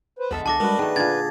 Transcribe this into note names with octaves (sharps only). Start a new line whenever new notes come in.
B4 C5
B1 E2 D3 G#3 B3 A4 E5
C2 D4 A4 A5 D6 A#6
G3 G#3 B3 D4 F#4 A#4 B4
D#3 A3 G#4
A#2 D3 G#6 A6